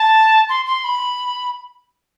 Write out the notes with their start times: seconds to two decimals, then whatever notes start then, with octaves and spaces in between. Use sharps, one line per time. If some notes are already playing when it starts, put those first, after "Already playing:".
Already playing: A5
0.49 C6
0.66 C6
0.84 B5